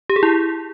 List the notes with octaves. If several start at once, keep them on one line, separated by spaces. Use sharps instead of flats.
G4
G#4
E4